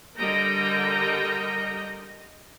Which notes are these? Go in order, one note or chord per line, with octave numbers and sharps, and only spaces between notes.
D3 G3 A#4 D#5 G5 A#5